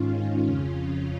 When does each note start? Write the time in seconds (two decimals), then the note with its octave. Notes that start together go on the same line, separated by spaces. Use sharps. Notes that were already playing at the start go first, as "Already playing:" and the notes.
Already playing: G#2 D#3 C#4 F4
0.46 F2 C#3